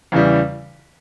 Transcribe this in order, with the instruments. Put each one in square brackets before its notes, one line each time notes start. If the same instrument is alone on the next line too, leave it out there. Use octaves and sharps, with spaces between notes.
[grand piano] E2 C#3 E3 G3